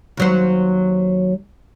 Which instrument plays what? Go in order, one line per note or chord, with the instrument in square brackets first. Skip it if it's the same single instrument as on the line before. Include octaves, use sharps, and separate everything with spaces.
[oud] D#2 F#3 C5